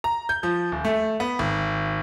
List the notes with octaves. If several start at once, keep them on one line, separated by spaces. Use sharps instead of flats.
A#5
G6
F3
D#1
A3
B3
G#1